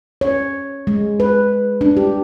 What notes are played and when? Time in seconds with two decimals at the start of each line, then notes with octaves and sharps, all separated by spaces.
0.21 C#5
0.87 G#3
1.20 B4
1.81 D4
1.97 G4